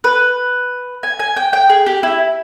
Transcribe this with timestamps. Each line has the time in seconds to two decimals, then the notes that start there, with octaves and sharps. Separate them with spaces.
0.04 B4
1.03 G#5
1.20 G#5
1.36 G5
1.53 G5
1.69 G#4
1.86 G4
2.03 E4